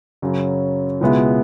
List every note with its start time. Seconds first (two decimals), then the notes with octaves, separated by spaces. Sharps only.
0.22 F#2 C#3 F#3
1.01 C#2 B2 G#3 B3 E4